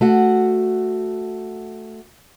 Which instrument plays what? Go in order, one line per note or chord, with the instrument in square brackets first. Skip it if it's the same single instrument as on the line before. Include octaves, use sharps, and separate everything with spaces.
[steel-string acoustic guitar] A3 F#4 F#5